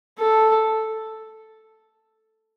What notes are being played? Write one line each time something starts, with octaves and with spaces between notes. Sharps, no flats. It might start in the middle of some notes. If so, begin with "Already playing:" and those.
A4